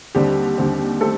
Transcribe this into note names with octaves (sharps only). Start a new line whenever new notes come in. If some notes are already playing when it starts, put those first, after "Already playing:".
D#2 D3 G3 C4 G4
D#2 D3 G3 C4
G3 A3 C4 A4